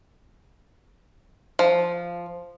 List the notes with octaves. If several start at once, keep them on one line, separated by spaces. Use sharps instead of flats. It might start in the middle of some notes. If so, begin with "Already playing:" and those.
F3